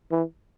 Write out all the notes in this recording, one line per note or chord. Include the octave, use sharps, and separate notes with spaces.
E3